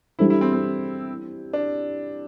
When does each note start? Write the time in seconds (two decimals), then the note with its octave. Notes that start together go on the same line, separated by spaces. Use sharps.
0.19 E3 G3 D4 E4 A4 C5
0.30 E4
0.41 C4
0.53 C4
1.53 D4